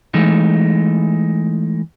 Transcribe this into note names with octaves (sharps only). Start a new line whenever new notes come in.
E3 G#3 A3 D#4